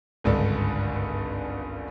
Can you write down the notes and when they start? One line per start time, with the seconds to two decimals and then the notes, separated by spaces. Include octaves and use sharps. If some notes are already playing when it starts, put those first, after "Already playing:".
0.24 G#1 C#2 G2 D3